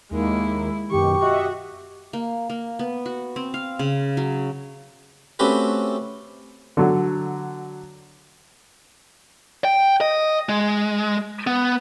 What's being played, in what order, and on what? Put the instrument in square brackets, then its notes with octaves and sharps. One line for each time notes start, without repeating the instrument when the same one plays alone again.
[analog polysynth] D#2 D#3 A#3 [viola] G#3 E4
[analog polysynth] F#2 B2 D#3 [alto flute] G4 [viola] C#6
[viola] F#4 [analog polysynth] D#5 E5 C#6
[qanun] A#3
A#3
B3
F#4
C4
F5
C#3
F#3
[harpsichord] A3 C4 C#4 F#4 G4 B4
[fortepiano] D3 F#3
[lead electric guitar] G5
D#5
G#3
B3